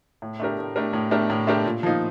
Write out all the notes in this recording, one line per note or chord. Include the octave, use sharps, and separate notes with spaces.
A2
A3 D4 G4 A#4
A2
A3 D4 G4 A#4
A2
A3 D4 G4 A#4
A2
A3 D4 G4 A#4
A#2
F3 A#3 D#4